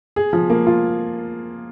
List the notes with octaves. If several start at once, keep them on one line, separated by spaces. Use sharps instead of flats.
G#4
F3
A#3
F4